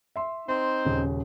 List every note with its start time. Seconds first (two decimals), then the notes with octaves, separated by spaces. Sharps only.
0.16 E5 C6
0.48 C4 D#4 C5 C6
0.85 D#1 C#3